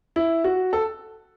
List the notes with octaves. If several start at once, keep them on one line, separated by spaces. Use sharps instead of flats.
E4
F#4
A4